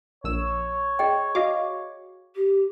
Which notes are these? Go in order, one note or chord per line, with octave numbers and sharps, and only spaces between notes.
A#1 C#5 E6 E7
G#4 D#5 G5
F#4 D#5 F5 D6
G4